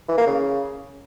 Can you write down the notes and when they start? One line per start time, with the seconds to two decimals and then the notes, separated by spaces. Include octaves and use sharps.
0.08 E3
0.18 A#3
0.27 C#3